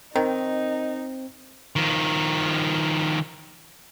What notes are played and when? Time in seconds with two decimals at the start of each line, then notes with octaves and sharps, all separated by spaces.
0.16 D#3 C4 D#4
1.76 D#3 F3